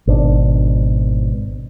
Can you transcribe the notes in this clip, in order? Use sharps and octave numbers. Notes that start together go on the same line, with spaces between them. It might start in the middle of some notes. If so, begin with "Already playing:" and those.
G#1 B2 C4 D4